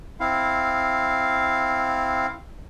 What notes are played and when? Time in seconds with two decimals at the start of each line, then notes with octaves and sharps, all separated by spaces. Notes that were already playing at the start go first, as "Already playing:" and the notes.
0.20 C4 E4 F5